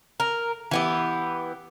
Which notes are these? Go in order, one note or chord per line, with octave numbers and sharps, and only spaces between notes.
A#4
E3 B3 G4